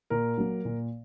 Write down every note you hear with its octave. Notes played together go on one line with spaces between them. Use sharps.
A#2 A#4
F#3 A#3
A#2